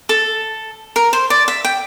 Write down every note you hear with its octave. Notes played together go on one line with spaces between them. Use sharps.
A4
A#4
C5
D5
E5
G5